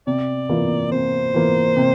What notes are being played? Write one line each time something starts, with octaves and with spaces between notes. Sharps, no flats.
C3 D5
E3 A#3 F4
C3 C5
E3 A#3 F4
C3